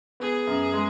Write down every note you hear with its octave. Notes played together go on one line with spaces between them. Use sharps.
B3 G#4
F#2
G#3